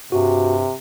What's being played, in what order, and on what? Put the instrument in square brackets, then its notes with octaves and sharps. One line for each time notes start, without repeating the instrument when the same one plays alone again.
[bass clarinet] G2 [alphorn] C3 [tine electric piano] F#4